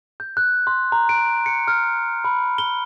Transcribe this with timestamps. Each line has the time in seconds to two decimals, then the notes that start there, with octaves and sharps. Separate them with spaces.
0.20 G6
0.37 F#6
0.67 C6
0.92 A#5
1.09 D7
1.46 C#7
1.68 F6
2.24 B5
2.58 G7